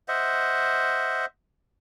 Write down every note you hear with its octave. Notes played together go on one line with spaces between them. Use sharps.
C5 D#5 E5 F#5